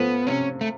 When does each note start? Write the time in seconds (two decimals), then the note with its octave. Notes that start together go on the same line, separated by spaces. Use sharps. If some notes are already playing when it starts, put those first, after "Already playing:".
Already playing: F3 A3 B3
0.27 C3 C#4
0.61 A3